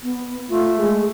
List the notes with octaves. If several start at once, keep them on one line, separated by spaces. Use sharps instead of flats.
B3
A3 F4
G#3